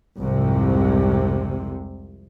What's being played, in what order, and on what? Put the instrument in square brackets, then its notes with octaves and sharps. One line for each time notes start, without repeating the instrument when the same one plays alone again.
[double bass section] C2 F2 G#2 C3